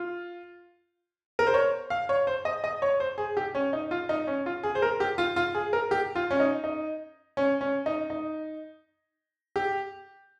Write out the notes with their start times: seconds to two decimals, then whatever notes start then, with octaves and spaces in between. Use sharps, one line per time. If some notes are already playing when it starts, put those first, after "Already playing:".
Already playing: F4
1.39 A#4
1.47 C5
1.54 C#5
1.90 F5
2.09 C#5
2.27 C5
2.45 D#5
2.64 D#5
2.82 C#5
3.00 C5
3.18 G#4
3.37 G4
3.55 C#4
3.73 D#4
3.91 F4
4.09 D#4
4.27 C#4
4.46 F4
4.63 G#4
4.75 C5
4.82 A#4
5.00 G4
5.18 F4
5.36 F4
5.55 G#4
5.73 A#4
5.91 G4
6.15 F4
6.31 C#4
6.40 D#4
6.64 D#4
7.37 C#4
7.61 C#4
7.86 D#4
8.10 D#4
9.56 G4